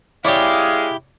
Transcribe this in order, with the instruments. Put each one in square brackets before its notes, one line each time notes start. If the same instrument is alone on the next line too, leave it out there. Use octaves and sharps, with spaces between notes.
[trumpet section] G#3 G#4 F5 [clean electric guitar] E4 G4 [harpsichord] C#5 D5